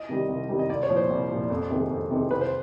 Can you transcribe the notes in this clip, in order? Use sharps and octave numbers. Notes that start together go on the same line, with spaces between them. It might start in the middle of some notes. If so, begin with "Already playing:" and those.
Already playing: D#5
C3 D#3 G3
C2
C3 D#3 G3
D#5
C2 D5
C#5
A#2 F3
C5
C2
A#2 F3
F2
C3 D#3 G#3
F2
C3 D#3 G#3
C2 B4
C5